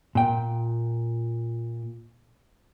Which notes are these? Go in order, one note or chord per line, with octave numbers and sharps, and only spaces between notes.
A#2 G5